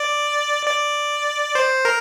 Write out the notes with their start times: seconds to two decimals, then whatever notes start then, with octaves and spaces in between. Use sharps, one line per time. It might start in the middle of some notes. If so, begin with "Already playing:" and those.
Already playing: D5
0.67 D5
1.55 C5
1.85 A#4